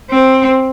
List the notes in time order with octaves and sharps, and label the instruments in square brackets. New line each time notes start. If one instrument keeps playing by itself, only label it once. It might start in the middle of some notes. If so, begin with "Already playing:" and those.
[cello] C4